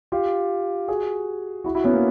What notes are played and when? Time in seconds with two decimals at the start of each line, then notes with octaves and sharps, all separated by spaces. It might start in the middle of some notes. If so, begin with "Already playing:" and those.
0.12 F4 G4
0.88 F#4 G#4
1.64 E4 F#4
1.75 E4 F#4
1.84 B3 C#4
1.93 A#3